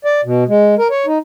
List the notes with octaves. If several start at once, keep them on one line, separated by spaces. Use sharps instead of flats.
D5
B2
G#3
A#4
C#5
D#4